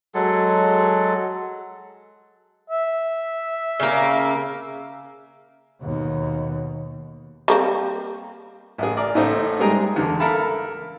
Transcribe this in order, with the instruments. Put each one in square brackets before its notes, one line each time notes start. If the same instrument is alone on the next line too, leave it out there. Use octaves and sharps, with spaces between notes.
[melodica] F#3 G#3 A4
[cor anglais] E5
[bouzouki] C#3 A#3
[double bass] D#2 B2
[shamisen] G3 A#3 C4
[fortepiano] A1 G#4
A#4 D5
A1 A2 A3 D#4 C5
G#2 G3 G#3 G#4 G5 A#5
E2 D3
A4 A#4 E5 F5 A5 B5